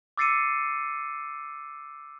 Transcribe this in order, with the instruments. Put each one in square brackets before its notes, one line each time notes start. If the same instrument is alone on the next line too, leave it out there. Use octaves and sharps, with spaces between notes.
[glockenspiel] D6 E6 A6 C7 C#7 D#7